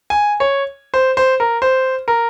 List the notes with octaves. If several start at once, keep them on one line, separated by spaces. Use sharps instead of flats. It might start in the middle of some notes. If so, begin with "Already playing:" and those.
G#5
C#5
C5
C5
A#4
C5
A#4